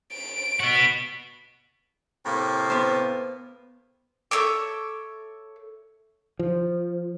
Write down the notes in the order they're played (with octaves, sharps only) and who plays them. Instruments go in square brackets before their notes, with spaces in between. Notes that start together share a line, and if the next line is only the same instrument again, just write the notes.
[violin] D7
[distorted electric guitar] B3 F#4
[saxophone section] A2 C3 A#3
[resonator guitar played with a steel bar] B3 C5
[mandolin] A4 C#5 E5 D6
[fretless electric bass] F3